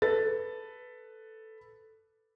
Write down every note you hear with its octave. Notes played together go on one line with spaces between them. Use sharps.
A4 B4 A6